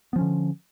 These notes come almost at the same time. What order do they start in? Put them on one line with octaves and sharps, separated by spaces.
B3 F3 C#4 D3